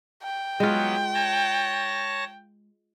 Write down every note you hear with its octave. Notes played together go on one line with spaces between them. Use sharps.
G5
F#3 G#3 B3 F4
C#5 A5 A#6